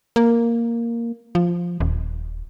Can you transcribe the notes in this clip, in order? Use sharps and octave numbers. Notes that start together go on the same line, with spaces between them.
A#3
F3
D#1